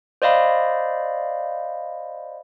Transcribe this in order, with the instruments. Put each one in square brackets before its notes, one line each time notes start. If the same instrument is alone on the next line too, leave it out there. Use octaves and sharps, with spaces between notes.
[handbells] C5 D5 D#5 F5 B5